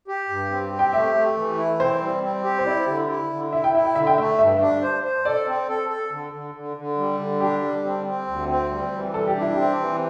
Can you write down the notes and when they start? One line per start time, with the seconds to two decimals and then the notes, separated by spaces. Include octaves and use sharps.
0.08 G4
0.29 G2
0.50 C4
0.72 G4
0.79 G5
0.93 A3 E5
1.15 A3
1.37 E3
1.58 E4
1.79 C4 C5
2.01 G3
2.23 C4
2.44 G4
2.59 C5
2.66 E4 D5
2.87 D3
3.10 E4
3.31 D3
3.53 E4 E5
3.64 G5
3.74 E4 E5
3.85 G5
3.95 D3 E5
4.07 G5
4.17 A3 E5
4.39 G2 E5
4.60 D4
4.82 C5
5.03 C5
5.25 A4 D5
5.47 C4
5.68 A4
5.90 A4
6.11 D3
6.33 D3
6.55 D3
6.77 D3
6.97 G3
7.20 D3
7.41 D4 G4
7.62 G3
7.84 C4
8.06 C4
8.27 D2
8.48 C4
8.70 G3
8.93 E3
9.14 G3 A4
9.27 G4
9.35 D4
9.41 E4
9.54 C4 G4
9.78 E3